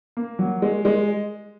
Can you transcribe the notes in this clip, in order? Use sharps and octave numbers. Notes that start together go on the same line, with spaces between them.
A#3
F#3
G#3
G#3